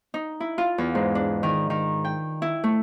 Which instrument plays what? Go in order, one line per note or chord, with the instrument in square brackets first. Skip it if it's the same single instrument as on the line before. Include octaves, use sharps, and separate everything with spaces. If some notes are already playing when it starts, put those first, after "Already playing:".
[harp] D#4
E4
F4
E2
G#2
D4
D#3
D#3
G5
E4
A3